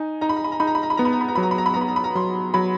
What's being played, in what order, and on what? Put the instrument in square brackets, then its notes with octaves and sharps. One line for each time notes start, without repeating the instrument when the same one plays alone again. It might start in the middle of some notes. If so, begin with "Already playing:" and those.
Already playing: [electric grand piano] D#4 [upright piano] G#5
[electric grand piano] D#4 [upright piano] A#5
[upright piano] B5
A#5
B5
A#5
[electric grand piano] D#4 [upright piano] B5
[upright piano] A#5
B5
A#5
B5
[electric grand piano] B3 [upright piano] A#5
[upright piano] B5
A#5
B5
A#5
[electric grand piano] F#3 [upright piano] B5
[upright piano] A#5
B5
A#5
B5
A#5
[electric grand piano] B3 [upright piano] B5
[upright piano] A#5
B5
A#5
[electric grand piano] F#3 [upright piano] C6
[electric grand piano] F#3 [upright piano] B5